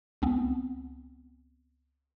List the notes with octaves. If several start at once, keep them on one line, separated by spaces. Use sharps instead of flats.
C#2 B3 C4